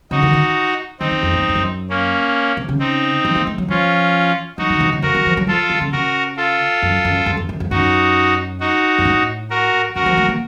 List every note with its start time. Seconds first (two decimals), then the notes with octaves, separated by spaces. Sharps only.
0.11 C#3 D#4 F#4
0.22 D#3
0.33 D#3
1.00 D#3 C4 D#4
1.11 F#2
1.23 F2
1.33 A2
1.41 F#2
1.49 F2
1.55 F#2
1.89 A#3 C#4
2.57 C3
2.69 C#3
2.79 C4 D#4
3.25 F3
3.35 A#3
3.47 A3
3.58 F#3
3.68 F3 C#4 F4
4.58 F#3 D#4 F#4
4.70 D#3
4.80 C3
4.92 C#3
5.02 F2 F#4 A#4
5.15 D#3
5.26 F3
5.37 F#3
5.47 F3 F4 A4
5.70 D#3
5.81 C#3
5.92 C#3 F#4 A#4
6.37 F4 A4
6.82 F#2
7.05 F#2
7.26 F#2
7.37 F#2
7.49 F#2
7.60 F2
7.71 F#2 D#4 F#4
8.60 D#4 F#4
8.98 F#2
9.05 A2
9.50 F#4 A#4
9.95 F#2 F#4 A#4
10.06 F3
10.17 A3
10.29 A#3